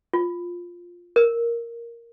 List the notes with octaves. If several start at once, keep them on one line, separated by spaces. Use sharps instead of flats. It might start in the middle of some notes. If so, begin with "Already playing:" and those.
F4
A#4